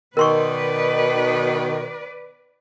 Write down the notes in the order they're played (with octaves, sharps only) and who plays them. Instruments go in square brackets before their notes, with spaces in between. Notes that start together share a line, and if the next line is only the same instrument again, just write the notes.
[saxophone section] B2 D#3 [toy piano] A#4 C6 C#6 [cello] B4 D5